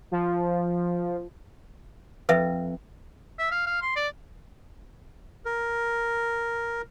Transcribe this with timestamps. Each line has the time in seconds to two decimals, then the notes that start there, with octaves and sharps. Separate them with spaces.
0.11 F3
2.29 F2 B4 E5
3.38 E5
3.51 F5
3.66 F5
3.82 C6
3.96 D5
5.45 A#4